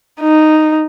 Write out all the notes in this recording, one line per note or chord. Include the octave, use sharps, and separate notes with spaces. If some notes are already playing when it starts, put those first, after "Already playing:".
D#4